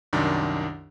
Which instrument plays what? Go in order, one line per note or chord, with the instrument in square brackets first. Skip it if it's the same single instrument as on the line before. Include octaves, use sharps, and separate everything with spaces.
[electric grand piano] C2 F#2 D#3 D4